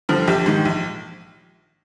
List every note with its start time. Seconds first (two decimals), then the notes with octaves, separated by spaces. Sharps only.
0.09 G2 D3 F3
0.27 A#1 G4
0.46 G#2 D#3
0.65 A#1